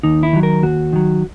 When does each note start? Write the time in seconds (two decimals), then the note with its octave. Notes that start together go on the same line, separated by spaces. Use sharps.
0.03 D#2 D#4
0.23 E4
0.33 D#3 F#3
0.43 A#4
0.63 D#2 F#4
0.93 D#3 F#3